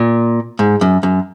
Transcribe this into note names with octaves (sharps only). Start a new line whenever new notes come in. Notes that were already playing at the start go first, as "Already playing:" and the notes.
Already playing: A#2
G#2
F#2
F#2